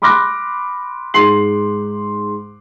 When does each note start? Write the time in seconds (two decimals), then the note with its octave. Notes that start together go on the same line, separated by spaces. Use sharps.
0.02 B5 C6 D6 F6 F#6 A#6
1.14 G#2 C6 C7 F#7